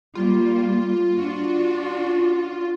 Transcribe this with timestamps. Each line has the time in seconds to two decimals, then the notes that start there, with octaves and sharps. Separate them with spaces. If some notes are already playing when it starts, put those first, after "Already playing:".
0.15 G3 A#3 F4
1.17 D4 F#4